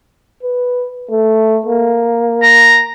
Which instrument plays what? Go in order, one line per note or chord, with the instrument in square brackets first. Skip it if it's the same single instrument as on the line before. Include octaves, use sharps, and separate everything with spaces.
[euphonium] B4
A3
A#3
[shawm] A#5